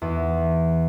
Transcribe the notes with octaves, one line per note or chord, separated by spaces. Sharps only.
E2